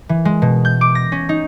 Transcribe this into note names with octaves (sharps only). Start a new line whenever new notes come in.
E3
G#3
B2
G6
D6
A#6
C#4
D#4